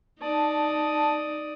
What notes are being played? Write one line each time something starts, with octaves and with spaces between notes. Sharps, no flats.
D#4 D5 A5 D#6